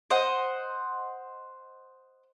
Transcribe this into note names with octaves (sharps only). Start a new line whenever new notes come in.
C5 D#5 F#5